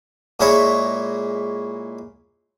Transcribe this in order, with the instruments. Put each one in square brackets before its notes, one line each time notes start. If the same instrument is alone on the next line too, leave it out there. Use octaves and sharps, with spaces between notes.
[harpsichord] A#2 G#3 E4 C#5 B5 C#6